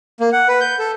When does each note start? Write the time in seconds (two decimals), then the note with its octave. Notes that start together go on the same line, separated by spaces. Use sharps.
0.20 A#3
0.32 F#5
0.48 B4
0.61 G6
0.79 A4